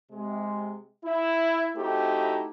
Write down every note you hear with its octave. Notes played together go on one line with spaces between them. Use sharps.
C3 G#3
E4
A3 C4 D#4 E4 F#4 G4